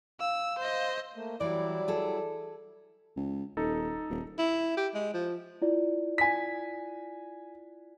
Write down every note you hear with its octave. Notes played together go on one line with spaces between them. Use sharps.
F5 E6
C5 D#5
A3 A#3
E3 F#3 G3 E4 D5
G#4 A4
C#2
D#1 D#4 A4
D#1
E4
G4
G#3
F3
E4 F4 D5
G#5 B6